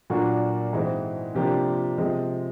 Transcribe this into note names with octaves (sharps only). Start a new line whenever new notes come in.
A#2 F#3 A#3 D4 F4 F#4
G#2 E3 G#3 C4
C3 F3 A#3 D4 F4 G4
C3 F3 G#3